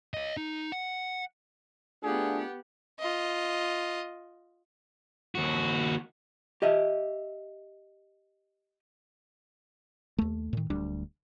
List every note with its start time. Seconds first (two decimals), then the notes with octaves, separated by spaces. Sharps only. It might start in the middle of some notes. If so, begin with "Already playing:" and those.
0.14 C#5 D#5
0.37 D#4
0.72 F#5
2.03 A3 B3 D4 F4 G4 G#4 F#5
2.99 F4 D#5
5.35 D#2 F#4
6.62 G4 D#5 E5
10.18 D#2 A3
10.53 A2 D#3
10.70 D1 D2 G3 D4